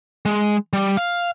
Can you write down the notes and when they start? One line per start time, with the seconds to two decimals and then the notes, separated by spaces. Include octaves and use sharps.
0.26 G#3
0.73 G3
0.97 F5